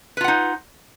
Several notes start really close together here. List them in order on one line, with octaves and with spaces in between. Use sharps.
B4 F4 F#5 D#4